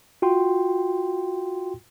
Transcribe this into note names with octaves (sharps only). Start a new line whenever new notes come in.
F4 F#4 G5 C6